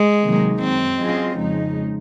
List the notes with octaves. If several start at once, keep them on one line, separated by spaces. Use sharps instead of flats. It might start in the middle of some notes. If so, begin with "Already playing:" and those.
Already playing: G#3
C3 D#3 F#3 A#3 D#4
F#2 D#3 F#3 C4
F#3 C#4 F4 G#4 D#5
F2 C#3 F3 G#3 D#4